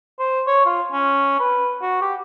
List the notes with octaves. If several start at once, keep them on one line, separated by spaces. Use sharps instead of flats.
C5
C#5
F4
C#4
B4
F#4
G4